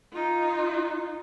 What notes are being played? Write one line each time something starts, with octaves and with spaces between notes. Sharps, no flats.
D#4 F4